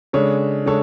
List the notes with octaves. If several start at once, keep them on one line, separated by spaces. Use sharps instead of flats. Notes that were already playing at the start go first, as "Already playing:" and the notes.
C#3 G#3 D4 A4 C#5
C#3 G#3 D4 A4 C#5